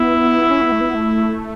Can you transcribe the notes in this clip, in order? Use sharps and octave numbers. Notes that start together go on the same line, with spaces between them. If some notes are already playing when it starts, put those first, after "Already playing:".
Already playing: B3 E4
C#4
B3
A3
B3
A3